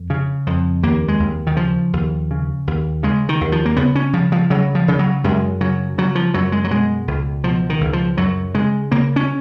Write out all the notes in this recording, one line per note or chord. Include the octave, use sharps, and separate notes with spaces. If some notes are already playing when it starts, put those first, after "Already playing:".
Already playing: F2
C#3
F2
D#2 A#3
G#3
D#2
D#3
C#3 F3
D#2
C#3
D#2
C#3 G#3
D#3
D#2
F3
A#3
C#3 B3
C#4
C#3 F3
F3
C#3 F#3
F3
C#3
F#3
F#2 G#3
C#3 F#3
C#3 F#3
F3
F#2 F#3
G#3
F#3
B2 G#3
C#2
B2 F3
D#3
C#2
F3
F#2 F#3
C#3 G#3
C#3 A#3
C#4